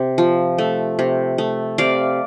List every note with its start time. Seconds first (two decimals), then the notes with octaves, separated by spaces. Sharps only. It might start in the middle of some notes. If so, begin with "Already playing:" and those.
Already playing: C3
0.18 F3
0.58 A3
0.99 C3
1.38 A3
1.78 C3 D5 F5